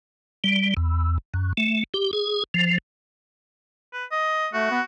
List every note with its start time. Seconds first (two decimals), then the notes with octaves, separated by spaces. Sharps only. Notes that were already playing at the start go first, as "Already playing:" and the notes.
0.44 G3
0.77 E2
1.34 F#2
1.57 A3
1.94 G4
2.13 G#4
2.54 F3
3.93 B4
4.12 D#5
4.53 A3 F#4
4.71 B3